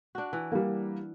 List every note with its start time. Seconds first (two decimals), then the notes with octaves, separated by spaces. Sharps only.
0.15 D4 F#4
0.33 E3
0.52 G3 A#3